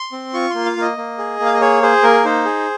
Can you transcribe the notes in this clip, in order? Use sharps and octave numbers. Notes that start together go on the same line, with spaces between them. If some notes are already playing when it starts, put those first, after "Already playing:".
Already playing: C6
C4
F4 C#6
A#3 C6
F5
A#3 D#5
A#3
G#4
A#3
F5
D#5
G#4 C#5
G#4 C5
A#3 A#4
D#4 C5
G#4